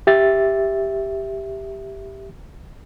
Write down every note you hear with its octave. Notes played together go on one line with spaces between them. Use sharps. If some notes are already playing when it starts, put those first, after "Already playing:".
G4 E5 A6